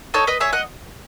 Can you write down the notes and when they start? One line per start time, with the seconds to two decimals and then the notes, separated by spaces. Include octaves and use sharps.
0.14 D#4 A4 C#5
0.27 B4 D#5
0.40 G#4 C#5 E5
0.53 D#5 F#5